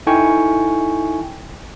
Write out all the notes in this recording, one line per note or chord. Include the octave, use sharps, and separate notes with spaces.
D#4 E4 A4 G5 G#5 C#6